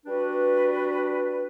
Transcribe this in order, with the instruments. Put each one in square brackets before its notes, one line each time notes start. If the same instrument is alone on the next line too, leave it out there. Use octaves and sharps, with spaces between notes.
[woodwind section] G3 D4 F#4 B4